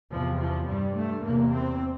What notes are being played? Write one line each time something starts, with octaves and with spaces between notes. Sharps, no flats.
E2 C3 F3
F3
G2 G3
A3
E2 C3 A#3
C4